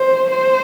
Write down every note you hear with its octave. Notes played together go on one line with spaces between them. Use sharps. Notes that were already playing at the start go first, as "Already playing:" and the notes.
Already playing: C5
C5